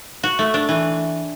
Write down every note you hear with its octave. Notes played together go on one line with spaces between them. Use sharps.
F#4
A3
D4
E3